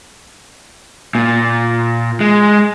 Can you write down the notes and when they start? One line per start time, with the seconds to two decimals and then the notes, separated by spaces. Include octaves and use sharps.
1.15 A#2
2.21 G#3